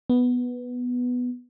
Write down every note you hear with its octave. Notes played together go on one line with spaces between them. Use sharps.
B3